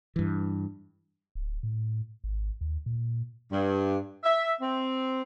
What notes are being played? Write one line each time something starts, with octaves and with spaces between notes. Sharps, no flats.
G2 E3
D1
A2
G#1
D#2
A#2
G2
E5
C4